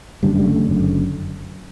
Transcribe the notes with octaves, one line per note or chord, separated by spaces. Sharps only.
F#1 F#2 D3 G3
G3
A3
F#1 F#2 D3